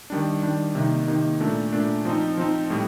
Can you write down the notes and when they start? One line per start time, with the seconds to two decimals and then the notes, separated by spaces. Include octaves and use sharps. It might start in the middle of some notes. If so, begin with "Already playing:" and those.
0.10 D#3 G3 D4
0.43 D#3 G3 D4
0.75 C3 D#3 A#3 D#4
1.07 C3 D#3 A#3 D#4
1.40 A#2 A3 D4
1.73 A#2 A3 D4
2.05 F3 C4 D#4
2.37 F3 C4 D#4
2.70 A2 G3